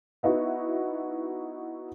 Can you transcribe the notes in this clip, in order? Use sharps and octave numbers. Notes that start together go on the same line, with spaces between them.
B3 D#4 E4 F#4